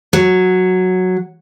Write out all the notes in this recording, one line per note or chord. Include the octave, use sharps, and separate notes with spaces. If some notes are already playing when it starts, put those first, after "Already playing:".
F#3